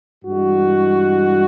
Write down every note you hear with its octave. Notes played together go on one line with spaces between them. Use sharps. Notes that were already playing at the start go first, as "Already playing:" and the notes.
G2 E3 G#3 F#4